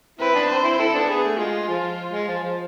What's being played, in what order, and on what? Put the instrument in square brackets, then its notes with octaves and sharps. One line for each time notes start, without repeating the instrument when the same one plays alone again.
[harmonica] C4 E4 [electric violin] B4
[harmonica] B3 D4
[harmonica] C4 [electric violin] C5
[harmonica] C4 E4
[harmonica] C4 E4 [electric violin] A4
[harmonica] B3 D4
[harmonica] B3 [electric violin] G#4
[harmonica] A3
[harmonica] G#3 [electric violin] F4
[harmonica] F3
G#3
F3
F3